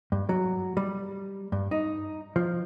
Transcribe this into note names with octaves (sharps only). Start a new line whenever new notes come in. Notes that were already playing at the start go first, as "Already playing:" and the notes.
G2
F#3
G3
G2
D#4
F3